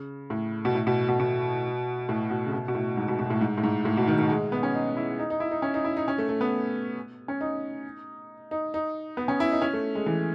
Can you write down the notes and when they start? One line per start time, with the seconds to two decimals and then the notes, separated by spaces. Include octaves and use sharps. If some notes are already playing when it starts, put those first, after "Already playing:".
Already playing: C#3
0.30 A2
0.65 B2
0.75 A2
0.87 B2
1.09 B2
1.20 B2
2.09 A2
2.30 B2
2.46 C#3
2.52 B2
2.68 B2
2.75 A2
2.97 G#2
3.08 B2
3.19 B2
3.30 A2
3.41 G#2
3.58 A2
3.63 G#2
3.85 A2
3.97 B2
4.07 D#3
4.18 D#3
4.29 G#3
4.52 B3
4.63 C#4
4.75 D#4
4.97 E4
5.19 D#4
5.30 D#4
5.40 E4
5.51 D#4
5.62 C#4
5.74 D#4
5.85 E4
5.97 D#4
6.08 C#4
6.18 A3
6.29 A3
6.41 B3
7.28 C#4
7.41 D#4
8.51 D#4
8.74 D#4
9.17 B3
9.28 C#4
9.40 E4
9.52 D#4
9.62 C#4
9.73 A3
9.95 G#3
10.06 E3